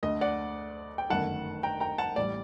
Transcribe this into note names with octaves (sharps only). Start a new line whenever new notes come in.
D2 D3 A3 D#5
D5 F#5
G5
G1 F#2 D#3 A3 F#5 A5
G5 A#5
G5 A#5
F#5 A5
A1 A2 G3 D5